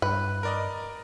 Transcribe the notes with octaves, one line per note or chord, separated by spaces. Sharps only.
G2 B4
A#4 D5 D#5